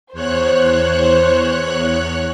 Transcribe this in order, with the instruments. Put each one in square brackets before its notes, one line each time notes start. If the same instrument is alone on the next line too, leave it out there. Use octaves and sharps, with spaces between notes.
[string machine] E2 C#5 F#6 [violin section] C5